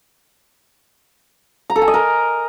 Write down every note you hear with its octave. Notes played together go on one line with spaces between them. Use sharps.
A#5
A4
G#5
D#5
A#4